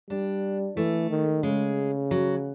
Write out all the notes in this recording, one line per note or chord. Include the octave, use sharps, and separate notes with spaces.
G3 D4
E3 A3
D#3
C#3 G#3
F#3